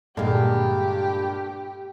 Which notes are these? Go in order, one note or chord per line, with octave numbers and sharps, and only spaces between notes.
G2 A#2 D3 G#3 G4